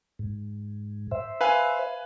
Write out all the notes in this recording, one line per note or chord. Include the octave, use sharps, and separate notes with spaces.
G#2
C5 E5
B4 F5 G#5